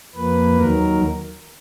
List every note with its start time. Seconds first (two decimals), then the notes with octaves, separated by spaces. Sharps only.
0.15 F2 F3 A#3 B4
0.57 D#2 D#3 F#3 A#4